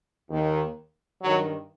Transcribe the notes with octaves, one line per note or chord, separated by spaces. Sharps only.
D#2 D#3
G2 D#3 F#3